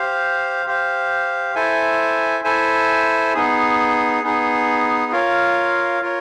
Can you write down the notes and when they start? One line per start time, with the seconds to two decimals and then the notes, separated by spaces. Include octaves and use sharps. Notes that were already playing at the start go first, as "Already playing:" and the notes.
Already playing: G4 C5 F5
0.66 G4 C5 F5
1.55 E4 A4 C5 E5 G#5
2.44 E4 A4 C5 E5 G#5
3.34 B3 D#4 G#4
4.23 B3 D#4 G#4
5.12 F4 A#4 C#5 F5
6.02 F4 A#4 C#5